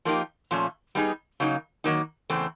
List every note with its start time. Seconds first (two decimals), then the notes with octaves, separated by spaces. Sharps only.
0.05 F3 A#3 D#4 G4
0.51 A#2 F3 A3 C#4
0.95 G3 B3 D#4 G#4
1.40 C#3 F#3 A#3 D#4
1.84 D#3 F#3 A#3 D#4
2.30 E2 C#3 A3 C4